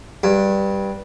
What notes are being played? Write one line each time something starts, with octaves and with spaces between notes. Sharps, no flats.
G2